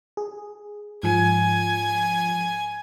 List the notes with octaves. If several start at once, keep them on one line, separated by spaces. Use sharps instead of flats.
G#4
G#2 F3 G#5